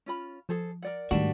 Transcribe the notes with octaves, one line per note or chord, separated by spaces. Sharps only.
C#4 F4 B5
F3 G#4 A4 C5
A#4 D5 F#5
G#2 D#3 G3 A3 D4 F#4